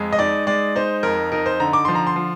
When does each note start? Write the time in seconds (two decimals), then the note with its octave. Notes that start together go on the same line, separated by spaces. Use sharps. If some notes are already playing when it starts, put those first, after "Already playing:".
Already playing: F2 G#3
0.12 D#5
0.19 D#4 D5
0.47 G#3 D5
0.76 D#4 C5
1.03 F2 A#4
1.32 D#4 A#4
1.46 C5
1.60 D3 A#5
1.73 D6
1.85 F3 C6
1.95 A#5
2.07 C6
2.16 F3